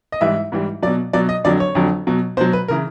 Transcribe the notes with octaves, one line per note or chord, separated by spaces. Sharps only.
D#5
G#2 E3 G3 E5
G#2 E3 G3
B2 F#3 D5
B2 F#3 D5
D#5
F2 D3 F#3 D5
C#5
F2 D3 F#3
B2 F#3
B2 F#3 C5
B4
C#3 E3 A#4